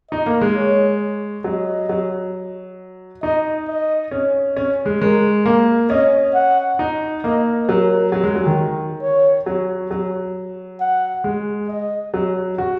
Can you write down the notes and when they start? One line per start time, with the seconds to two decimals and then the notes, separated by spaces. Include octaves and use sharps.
0.11 D#4 D#5
0.26 A#3
0.41 G#3
0.56 C#5
1.44 F#3 D#5
1.89 F#3
3.22 D#4 D#5
3.68 D#5
4.11 C#4
4.57 C#4 C#5
4.86 G#3
5.01 G#3 A#4
5.46 A#3
5.90 C#4 D#5
6.35 F#5
6.79 D#4
7.24 A#3 D#5
7.68 F#3 A#4
8.12 F#3
8.24 G#3
8.35 F#3
8.46 D#3
9.01 C#5
9.46 F#3
9.91 F#3
10.80 F#5
11.24 G#3
11.69 D#5
12.14 F#3
12.58 F#4